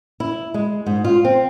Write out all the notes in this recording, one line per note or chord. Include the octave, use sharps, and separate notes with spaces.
E4
G#3
G#2
F4
C4